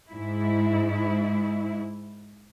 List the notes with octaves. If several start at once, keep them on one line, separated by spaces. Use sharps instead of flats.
G#2 E4